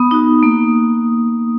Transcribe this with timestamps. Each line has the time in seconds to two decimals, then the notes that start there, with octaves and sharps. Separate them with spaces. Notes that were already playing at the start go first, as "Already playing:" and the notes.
Already playing: B3 D#6
0.11 D#4 F#4 D#6
0.43 A#3